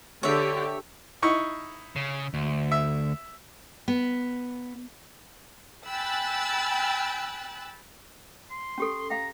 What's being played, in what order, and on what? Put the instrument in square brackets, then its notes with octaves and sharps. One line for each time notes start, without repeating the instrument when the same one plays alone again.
[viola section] D3 G4 [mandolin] C#5 E5
[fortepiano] D#4 E4 C#6
[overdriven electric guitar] C#3
D2
[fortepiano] E5
[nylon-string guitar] B3
[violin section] G5 G#5 B5 E6 F#6 A6
[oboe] C6
[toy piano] C#4 G4 A4
[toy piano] F5 G5 [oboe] A#5